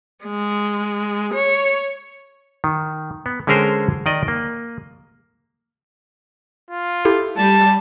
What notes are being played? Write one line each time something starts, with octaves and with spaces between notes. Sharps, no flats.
G#3
C#5
D#3
B3
D3 G#3 C#4 G#4 A#4 C5
D#3 D5 D#5
A#3
F4
E4 G4 A4
G3 A5